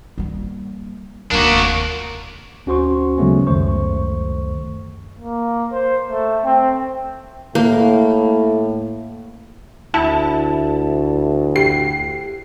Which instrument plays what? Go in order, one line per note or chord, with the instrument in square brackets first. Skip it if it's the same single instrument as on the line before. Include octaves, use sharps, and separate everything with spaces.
[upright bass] G3 A#3
[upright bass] F1 D#2 [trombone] A#3 [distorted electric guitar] D4 F#4
[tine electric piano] D2 C#4 F#4 C5 C6 C#6
C#3 F#3 G#3 A3 B3 C#4
C#2 F#2 D#3 A3 C5 C#6
[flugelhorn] A#3
C5
A3
C4
[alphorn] A2 [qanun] A#3
[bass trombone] D2 [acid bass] E4 [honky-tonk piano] A5
[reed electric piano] G4 [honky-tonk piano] C7